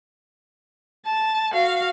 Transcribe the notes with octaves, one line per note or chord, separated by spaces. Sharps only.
A5
F#4 F5